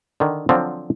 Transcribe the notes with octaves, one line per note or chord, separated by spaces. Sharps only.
D3 D#3
D3 F3 F#3 C4